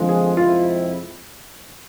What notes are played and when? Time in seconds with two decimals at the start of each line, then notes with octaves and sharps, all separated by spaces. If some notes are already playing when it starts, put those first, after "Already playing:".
Already playing: F2 D3 F3 G#3
0.09 G#4
0.37 F2 C3 G#3 C4 E4 F4